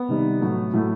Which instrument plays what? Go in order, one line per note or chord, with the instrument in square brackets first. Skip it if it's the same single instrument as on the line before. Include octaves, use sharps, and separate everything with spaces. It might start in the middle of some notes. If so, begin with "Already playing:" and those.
Already playing: [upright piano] B3
[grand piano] C3 D#3 G3 D#4
A2 F#3 A3 E4
A2 F#3 A3 E4